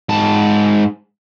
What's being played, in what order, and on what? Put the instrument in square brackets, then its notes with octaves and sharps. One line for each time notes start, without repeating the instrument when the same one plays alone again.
[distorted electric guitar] G#2 A5